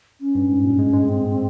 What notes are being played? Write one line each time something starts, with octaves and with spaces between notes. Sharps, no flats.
C#4
G2
G#2
A#2
G#3
G#3
C4